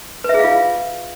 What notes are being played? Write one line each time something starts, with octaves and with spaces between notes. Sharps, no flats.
F4 G#4 B4 E5 F5